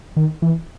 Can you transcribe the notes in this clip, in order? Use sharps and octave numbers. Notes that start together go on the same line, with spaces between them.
D#3
E3